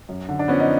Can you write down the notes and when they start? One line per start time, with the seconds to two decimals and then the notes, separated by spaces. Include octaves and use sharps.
0.09 F#2
0.29 D3
0.39 D4
0.48 F3 B3 C#4
0.60 D#4